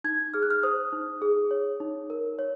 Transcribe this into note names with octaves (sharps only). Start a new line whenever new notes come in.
D#4 G#6
G#4 F6
F#6
F6
C5 D#6
D#4
G#4
C#5
D#4
A#4
C#5